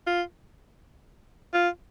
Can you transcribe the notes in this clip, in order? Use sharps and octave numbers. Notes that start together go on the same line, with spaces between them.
F4
F4